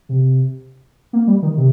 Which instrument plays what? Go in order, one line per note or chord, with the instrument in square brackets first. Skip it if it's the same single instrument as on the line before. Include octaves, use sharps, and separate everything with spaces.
[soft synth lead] C3
A#3
G3
D#3
C3